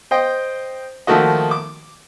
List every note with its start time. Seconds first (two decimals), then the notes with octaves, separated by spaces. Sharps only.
0.11 C5 D#5 G5
1.07 D#3 F3 A3 A#3 F#4 D#5
1.51 D6